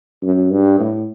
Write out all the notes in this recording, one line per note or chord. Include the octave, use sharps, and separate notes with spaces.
F#2
G2
A2